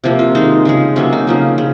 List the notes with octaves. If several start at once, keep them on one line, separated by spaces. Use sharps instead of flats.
C3 F3 A#3
F4
D#3 G#3 D#4
C#3 F3 G#3
C3 F#3 A#3 C#4
D#4
C#3 F3 A#3
C#3